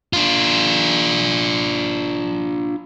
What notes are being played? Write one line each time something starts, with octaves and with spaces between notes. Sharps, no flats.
D4 F4